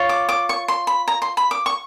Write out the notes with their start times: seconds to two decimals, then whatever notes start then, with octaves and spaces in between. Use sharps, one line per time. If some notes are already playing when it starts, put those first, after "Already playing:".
Already playing: F4 C#5
0.09 D6
0.29 D6
0.49 C#6
0.68 C6
0.87 B5
1.08 A#5
1.22 C6
1.37 B5
1.51 D6
1.66 C#6